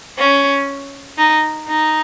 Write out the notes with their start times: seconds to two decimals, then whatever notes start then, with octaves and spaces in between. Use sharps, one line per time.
0.18 C#4
1.18 D#4
1.68 D#4